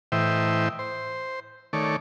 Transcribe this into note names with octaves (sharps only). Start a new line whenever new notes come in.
A2 E3 C5 D#5 E5 G5
C5
D#3 A3 C#5 D5